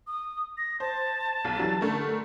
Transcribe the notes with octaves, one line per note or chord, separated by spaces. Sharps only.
D#6
A#6
C5 A5
B1
E3 F#3 G3
D3 A3 A#4